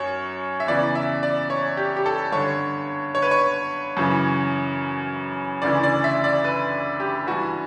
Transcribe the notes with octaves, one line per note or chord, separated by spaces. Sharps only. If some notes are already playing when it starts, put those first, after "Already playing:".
Already playing: F#2 C#5
E5
E2 C#3 E3 D5
E5
D5
C#5
G4
G4
A4
G2 D3 C#5
C#5
B4
C#5
F#2 C#3 E3
D2 C#3 E3 D5
D5
E5
D5
B4
G4
G2 E3 F#4